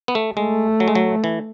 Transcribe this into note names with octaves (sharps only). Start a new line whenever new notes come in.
B3
A3
G#3 A3
F#3
G#3
F#3
E3